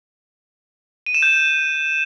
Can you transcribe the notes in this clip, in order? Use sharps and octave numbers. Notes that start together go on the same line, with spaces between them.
D#7
E7
G6